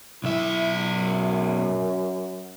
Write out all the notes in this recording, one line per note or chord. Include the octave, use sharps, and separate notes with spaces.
B1 E4 E5
F#2